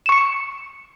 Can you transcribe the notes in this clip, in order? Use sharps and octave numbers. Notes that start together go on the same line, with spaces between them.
C#6 C#7 E7